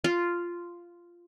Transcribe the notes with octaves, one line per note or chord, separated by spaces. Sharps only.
F4